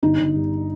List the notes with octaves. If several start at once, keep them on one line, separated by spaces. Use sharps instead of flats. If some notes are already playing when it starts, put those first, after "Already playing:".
G1 D#4
G1
G2